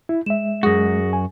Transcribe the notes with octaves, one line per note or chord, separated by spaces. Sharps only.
E4
G#3 E5 E7
F#2 G#3 F#4 G#4 D#6 A#6
G#5